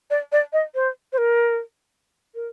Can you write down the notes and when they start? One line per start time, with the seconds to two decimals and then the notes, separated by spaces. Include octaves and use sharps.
0.10 D5
0.32 D5
0.53 D#5
0.75 C5
1.13 C5
1.18 A#4
2.35 A#4